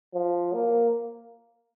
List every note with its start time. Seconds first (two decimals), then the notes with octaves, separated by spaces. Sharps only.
0.14 F3
0.53 A#3